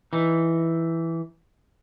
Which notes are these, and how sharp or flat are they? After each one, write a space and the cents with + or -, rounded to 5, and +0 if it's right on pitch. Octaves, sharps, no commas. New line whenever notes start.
E3 +0 D#4 +0